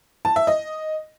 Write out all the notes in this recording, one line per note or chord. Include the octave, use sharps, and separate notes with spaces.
A5
E5
D#5